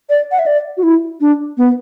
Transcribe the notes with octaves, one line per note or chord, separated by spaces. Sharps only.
D5
F#5
E5
D5
F#4
E4
D4
B3